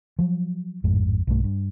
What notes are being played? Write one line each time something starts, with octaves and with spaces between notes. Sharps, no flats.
F3 F#3
A1 F2 G#2
B1 G2 A3
G2